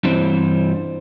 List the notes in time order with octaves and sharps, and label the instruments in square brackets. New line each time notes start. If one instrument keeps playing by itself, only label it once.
[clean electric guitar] G2 E3 G3 C4 C5